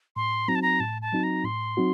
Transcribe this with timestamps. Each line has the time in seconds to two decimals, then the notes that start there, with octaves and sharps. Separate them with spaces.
0.16 A2 C6
0.48 F#3 C4 D#4 F#4 A#5
0.55 A5
0.62 A#5
0.80 A2 A5
1.02 A5
1.13 F#3 C4 D#4 F#4
1.23 A#5
1.44 A2 C6
1.77 F#3 C4 D#4 F#4